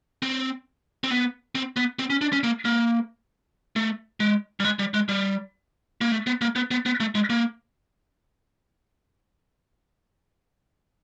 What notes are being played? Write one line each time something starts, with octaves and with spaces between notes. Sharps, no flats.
C4
C4
B3
C4
B3
C4
C#4
D4
C#4
A#3
A#3
A3
G#3
G3
G#3
G3
G#3
G3
A#3
A3
B3
A#3
B3
B3
B3
A3
G#3
A#3